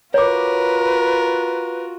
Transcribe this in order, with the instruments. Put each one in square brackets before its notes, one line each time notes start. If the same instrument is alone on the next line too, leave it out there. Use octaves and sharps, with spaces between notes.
[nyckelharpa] F4 F#4 [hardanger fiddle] A#4 [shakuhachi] B4 [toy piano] C#5 D6